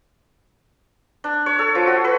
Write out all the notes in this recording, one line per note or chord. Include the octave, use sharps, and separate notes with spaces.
D4
C#5
A4
F3
F#4
B4